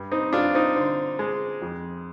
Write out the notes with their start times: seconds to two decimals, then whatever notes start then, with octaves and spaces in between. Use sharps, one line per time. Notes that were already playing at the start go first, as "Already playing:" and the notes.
Already playing: G2
0.11 C4 D#4
0.33 G2 D4 F4
0.54 C4 D#4
0.76 D3 C4
1.19 G#3
1.62 F2